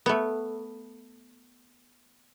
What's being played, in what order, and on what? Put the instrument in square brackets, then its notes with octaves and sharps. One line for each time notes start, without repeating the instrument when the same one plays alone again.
[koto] A3 B3